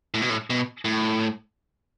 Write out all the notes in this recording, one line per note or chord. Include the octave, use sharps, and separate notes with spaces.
A2
B2
A2
B2
A2